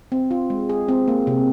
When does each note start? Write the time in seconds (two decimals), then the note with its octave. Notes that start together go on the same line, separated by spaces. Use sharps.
0.12 C4
0.31 F4
0.50 G#3
0.69 G#4
0.88 C4
1.08 A#3
1.27 C3